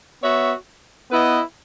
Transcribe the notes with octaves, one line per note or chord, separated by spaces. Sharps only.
B3 F#4 C#5 E5
B3 E4 B4 D#5